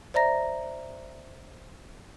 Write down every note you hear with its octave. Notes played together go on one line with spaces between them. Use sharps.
C5 D5 E5 A#5 A#6